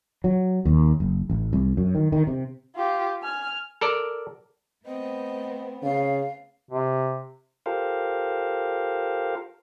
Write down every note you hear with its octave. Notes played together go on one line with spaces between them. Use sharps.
F#3
D#2
F#1
A1
C2
F#2
D#3
D#3
C3
F4 G4
G#5 F6
A4 A#4 D5
A3 B3 C4 D#5
C#3 F5
C3
F4 G4 A4 A#4 C5 F5